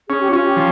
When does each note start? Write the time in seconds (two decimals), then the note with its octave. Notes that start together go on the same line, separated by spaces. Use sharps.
0.09 C#4 G#4
0.20 G4
0.31 C#4 F4
0.42 G4
0.57 F3